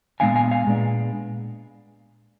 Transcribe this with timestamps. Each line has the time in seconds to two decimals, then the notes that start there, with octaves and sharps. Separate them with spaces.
0.20 A#2 G#3 B3 D4 F5 G#5
0.36 F5 G#5
0.51 F5 G#5
0.67 A#2 G#3 B3 D4